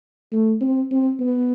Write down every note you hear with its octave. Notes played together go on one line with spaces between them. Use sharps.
A3
C4
C4
B3